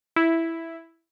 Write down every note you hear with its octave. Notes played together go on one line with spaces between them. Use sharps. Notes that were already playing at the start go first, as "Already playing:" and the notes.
E4